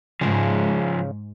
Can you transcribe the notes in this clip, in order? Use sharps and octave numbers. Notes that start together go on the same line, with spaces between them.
G#2 C#3 F3 G#4